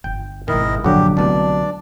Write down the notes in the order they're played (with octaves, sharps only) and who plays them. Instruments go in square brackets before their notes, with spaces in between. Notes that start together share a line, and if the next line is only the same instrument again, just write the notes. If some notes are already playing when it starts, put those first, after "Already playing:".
[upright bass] G1 F4 [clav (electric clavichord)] G5
[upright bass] G#1 B2 [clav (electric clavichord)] D#3 [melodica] E4 A#4 D#5
[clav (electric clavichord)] A#1 F#5 [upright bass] G2 [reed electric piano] D3 F#3 F#4 [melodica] G4
[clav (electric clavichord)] C2 B2 [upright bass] A3 [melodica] D4 D5